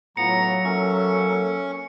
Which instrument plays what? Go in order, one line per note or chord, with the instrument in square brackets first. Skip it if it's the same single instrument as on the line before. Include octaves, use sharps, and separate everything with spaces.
[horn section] A2 F4 A#5 [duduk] F#3 [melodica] B3 [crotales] C#7
[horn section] A#3 A4 E5 [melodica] C#4 C#6